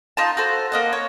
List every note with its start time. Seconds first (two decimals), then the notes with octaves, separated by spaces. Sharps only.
0.17 D#4 F4 A5
0.37 F#4 A4 C5
0.72 A#3 D#5 F#5
0.93 C#5